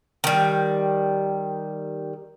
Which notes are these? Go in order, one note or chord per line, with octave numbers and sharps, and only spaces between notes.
D#3 G3